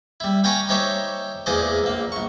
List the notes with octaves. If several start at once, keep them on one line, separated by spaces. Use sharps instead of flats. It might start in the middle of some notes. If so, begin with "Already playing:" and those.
G3 E4
F5 G5 G#5 A#5 B5 C#6
D#4 G4 C5 C#5 E5 D6
E2 A#2 G#3 C5 D5 D#5
A#1 A#3
A#1 C#6